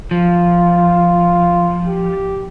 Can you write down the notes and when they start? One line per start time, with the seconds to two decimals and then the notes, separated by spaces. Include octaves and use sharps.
0.11 F3 F4
1.87 G4